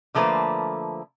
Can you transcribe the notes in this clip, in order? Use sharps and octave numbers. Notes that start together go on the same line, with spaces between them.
D3 F3 A3 A#3 B4 C5